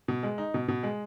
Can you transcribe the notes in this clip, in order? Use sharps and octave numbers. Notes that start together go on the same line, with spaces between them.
B2
G#3
D#4
B2
B2
G#3